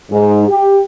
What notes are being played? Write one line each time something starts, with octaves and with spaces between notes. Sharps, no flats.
G#2
G4